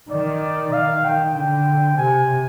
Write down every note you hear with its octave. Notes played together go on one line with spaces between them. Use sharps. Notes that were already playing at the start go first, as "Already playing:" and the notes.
D#3 D5
D#3 F5
D#3 G5
D3 G5
C3 G#5